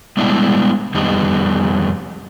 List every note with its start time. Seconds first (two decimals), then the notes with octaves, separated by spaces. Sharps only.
0.17 G3 G#3 B3 D4 E4 E5
0.94 F2 D#3 G3 B3 D#4